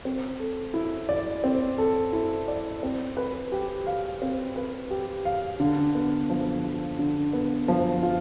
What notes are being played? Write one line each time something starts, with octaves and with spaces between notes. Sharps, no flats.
C4
A4
E4
D5
C4
A4
E4
D5
C4
B4
G4
F5
C4
B4
G4
F5
D3
B3
F3
F4
D3
B3
F3
F4